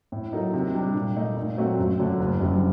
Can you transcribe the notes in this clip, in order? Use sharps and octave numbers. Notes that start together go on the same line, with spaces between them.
A2
F#3 A#3 D#4 A4
C3
G3 D4
A#2
A3 D#4
A#2
F#3 A3 C4 F#4
F#2
D3 F#3 A3 D4
F#1
F#2 D3 G3